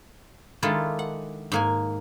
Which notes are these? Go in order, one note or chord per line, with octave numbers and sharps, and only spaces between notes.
D#3 G#3 D4 E4 F4 A4
F#5
G#2 A#3 G#5